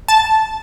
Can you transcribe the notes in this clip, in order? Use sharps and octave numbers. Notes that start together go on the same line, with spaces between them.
A5